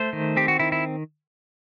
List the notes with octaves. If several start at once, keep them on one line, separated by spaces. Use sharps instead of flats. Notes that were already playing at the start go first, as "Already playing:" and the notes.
Already playing: A3 C5
D#3
C4 G4
F#4
D#3 E4
E4